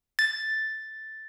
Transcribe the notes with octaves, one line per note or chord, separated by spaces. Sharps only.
A6